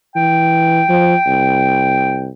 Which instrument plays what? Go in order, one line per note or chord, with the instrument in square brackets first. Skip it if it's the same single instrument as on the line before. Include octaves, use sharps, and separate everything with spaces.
[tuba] E3 [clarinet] G5
[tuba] F3
C2